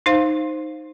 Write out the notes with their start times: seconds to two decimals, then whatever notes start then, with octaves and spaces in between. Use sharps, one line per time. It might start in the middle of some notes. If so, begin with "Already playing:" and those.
0.06 D#4 C5 F5